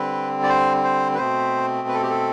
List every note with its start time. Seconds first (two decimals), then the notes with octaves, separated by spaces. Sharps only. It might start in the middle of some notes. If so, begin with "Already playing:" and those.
Already playing: D3 G3 C4 B4
0.43 D5
0.49 C5
0.84 C5
1.15 B4
1.18 B2 A3 C4 C5
1.88 B4
1.94 A4
2.03 G4
2.10 A4